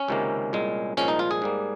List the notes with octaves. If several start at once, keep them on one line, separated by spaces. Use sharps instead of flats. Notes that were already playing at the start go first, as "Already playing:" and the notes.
Already playing: C#4
C#2 C3 D#3 A#3
C2 A#2 G#3
C2 A#2 F3 G#3 C#4
D#4
F4
G#4
G#2 G3 A#3